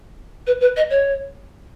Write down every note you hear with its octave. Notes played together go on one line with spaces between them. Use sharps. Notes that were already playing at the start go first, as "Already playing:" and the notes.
B4
B4
D#5
C#5